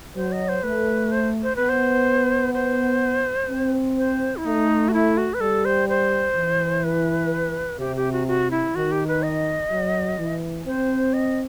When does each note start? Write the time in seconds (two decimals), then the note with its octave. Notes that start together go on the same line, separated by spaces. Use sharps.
0.16 F#3 C5
0.32 D#5
0.49 C5
0.63 A3 B4
1.12 C5
1.43 C5
1.56 B3 B4
1.69 C5
2.54 C5
3.50 C4
3.97 C5
4.37 E4
4.45 A3 D#4
4.89 F#4
4.94 E4
5.17 F#4
5.34 B4
5.41 G3 A4
5.65 C5
5.89 C5
6.37 E3
6.84 B4
7.80 C3 G4
7.96 G4
8.12 F#4
8.28 F#4
8.51 E4
8.75 D#3 F#4
8.92 G4
9.07 B4
9.23 D#5
9.71 F#3
10.19 E3
10.66 C4 C5
11.13 D#5